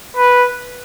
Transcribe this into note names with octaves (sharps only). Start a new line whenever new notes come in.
B4